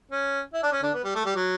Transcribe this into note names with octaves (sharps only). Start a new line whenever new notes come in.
C#4
E4
D4
C#4
D3 D4
B3
G3
A3
G3
F#3